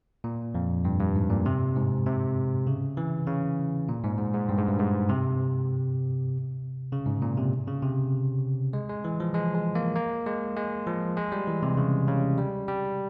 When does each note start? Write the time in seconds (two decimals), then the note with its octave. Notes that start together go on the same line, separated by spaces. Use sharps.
0.24 A#2
0.55 F2
0.85 G2
1.00 G2
1.15 G#2
1.30 A#2
1.46 C3
1.76 G#2
2.06 C3
2.67 C#3
2.97 E3
3.27 C#3
3.89 A#2
4.04 G#2
4.18 G#2
4.33 G#2
4.49 G2
4.58 G#2
4.68 G2
4.79 G#2
5.09 C3
6.92 C#3
7.06 G#2
7.22 A#2
7.37 C3
7.68 C#3
7.83 C3
8.73 G#3
8.89 G#3
9.04 E3
9.20 F3
9.34 G#3
9.54 G#3
9.75 A#3
9.96 A#3
10.26 G#3
10.57 G#3
10.87 F3
11.17 G#3
11.32 G3
11.47 E3
11.63 C3
11.77 C#3
12.08 C#3
12.38 G3
12.68 G3